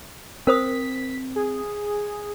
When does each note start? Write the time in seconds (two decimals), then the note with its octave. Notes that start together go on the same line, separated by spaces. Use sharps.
0.47 C4 A#4 C5 D#6 B6
1.36 G#4